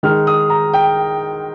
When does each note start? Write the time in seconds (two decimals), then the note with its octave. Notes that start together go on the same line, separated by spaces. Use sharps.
0.03 D#3 G#3 D#4 F6
0.27 D#6
0.50 A#5
0.74 G5